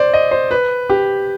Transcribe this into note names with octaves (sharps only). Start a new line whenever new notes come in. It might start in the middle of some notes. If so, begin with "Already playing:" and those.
Already playing: C5 D5
D#5
C5
B4
G4